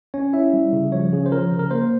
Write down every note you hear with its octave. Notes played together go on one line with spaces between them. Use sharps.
C#4 C#5
E4 E5
G3
C#3
F3 C#5
C#3
C5
F3 A#4
C#3
A#4
A#3 C5